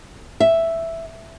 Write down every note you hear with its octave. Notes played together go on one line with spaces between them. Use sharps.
E5